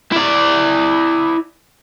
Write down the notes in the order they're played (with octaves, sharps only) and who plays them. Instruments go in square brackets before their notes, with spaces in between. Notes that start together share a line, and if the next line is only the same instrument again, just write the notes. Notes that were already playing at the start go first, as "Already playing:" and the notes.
[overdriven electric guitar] E4 D5